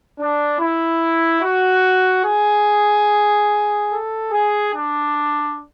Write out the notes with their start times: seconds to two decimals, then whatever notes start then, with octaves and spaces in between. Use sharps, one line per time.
0.18 D4
0.59 E4
1.42 F#4
2.24 G#4
3.90 A4
4.32 G#4
4.73 D4